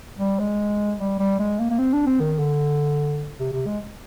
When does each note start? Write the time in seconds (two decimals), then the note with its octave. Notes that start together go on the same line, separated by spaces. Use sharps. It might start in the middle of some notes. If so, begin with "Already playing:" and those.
0.18 G3
0.39 G#3
0.99 G3
1.19 G3
1.39 G#3
1.59 A#3
1.70 A#3
1.79 C4
1.93 D4
2.06 C4
2.20 D#3
2.39 D3
3.40 C3
3.52 C3
3.67 G#3